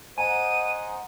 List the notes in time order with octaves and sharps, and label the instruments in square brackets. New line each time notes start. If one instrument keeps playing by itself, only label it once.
[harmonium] C5 D#5 F#5 [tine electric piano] G#5 [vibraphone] A#5 [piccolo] D#7